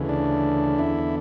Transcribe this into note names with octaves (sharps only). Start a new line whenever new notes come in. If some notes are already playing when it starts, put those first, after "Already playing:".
Already playing: D2 C#3 E3
D4
E2 D3 E4